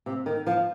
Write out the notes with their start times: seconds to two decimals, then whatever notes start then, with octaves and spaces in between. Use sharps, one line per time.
0.06 C3
0.26 D#3
0.47 F3